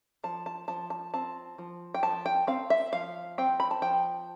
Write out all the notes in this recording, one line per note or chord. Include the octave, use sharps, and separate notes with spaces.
F3 A5
A5
F3 A5
A5
C4 A5
F3
G5
F3 A5
G5
C4 F5
E5
F3 F5
C4 G5
B5
A5
F3 G5